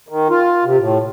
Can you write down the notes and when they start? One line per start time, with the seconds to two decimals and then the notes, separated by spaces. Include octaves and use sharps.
0.09 D#3
0.30 F4
0.65 C3
0.78 A2